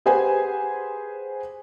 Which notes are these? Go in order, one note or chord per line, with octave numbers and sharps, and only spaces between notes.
G4 G#4 B4 C5 F#5 G#5